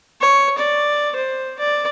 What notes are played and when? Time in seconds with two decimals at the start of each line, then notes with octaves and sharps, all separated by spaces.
0.21 C#5
0.58 D5
1.16 C5
1.59 D5